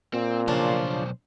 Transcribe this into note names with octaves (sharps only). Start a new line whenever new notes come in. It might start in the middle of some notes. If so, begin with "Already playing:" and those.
A#2 C4
B1 C#3 F3 D4 C5